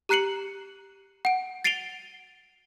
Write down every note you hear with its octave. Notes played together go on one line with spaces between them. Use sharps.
G4 A#5 F#6 C7 C#7 F#7
F#5 D7
A6 C7 D7 D#7 F7 G7